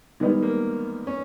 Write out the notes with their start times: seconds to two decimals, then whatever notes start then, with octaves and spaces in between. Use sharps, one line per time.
0.20 D#3 G3 G#3 B3 D#4
0.42 A#3
1.07 C#4